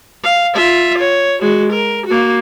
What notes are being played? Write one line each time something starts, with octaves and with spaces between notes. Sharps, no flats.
F5
F4 E5
C#5
G#3 F#4
A#4
A#3 F#4